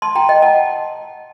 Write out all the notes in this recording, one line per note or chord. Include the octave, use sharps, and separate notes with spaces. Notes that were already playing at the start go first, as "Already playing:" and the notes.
A5 C6
G5 A#5
D#5 G5
F#5 A5